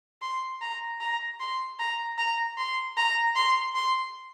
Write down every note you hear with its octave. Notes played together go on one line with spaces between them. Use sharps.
C6
A#5
A#5
C6
A#5
A#5
C6
A#5
C6
C6